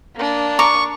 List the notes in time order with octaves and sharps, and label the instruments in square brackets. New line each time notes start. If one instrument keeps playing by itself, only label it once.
[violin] A#3 D4
[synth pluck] A#5 [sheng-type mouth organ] C#6 [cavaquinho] D6